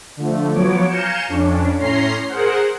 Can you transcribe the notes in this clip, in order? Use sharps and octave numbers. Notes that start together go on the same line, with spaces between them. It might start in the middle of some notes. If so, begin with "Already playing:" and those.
D3 F3 A3
F3 F#3 B3 C#5 D6
F5 G#5 A#5 G6 C#7 E7
F2 C#4 D4
A2 C#4 A#5 C6 C7
G#4 A#4 C5 F#5